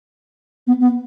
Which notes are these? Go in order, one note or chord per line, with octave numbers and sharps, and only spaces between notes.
B3
B3